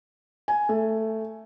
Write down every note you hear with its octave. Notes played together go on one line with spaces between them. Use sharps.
G#5
A3